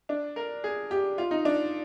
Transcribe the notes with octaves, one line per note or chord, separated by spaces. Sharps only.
D4
A#4
G#4
G4
F4
D#4
D4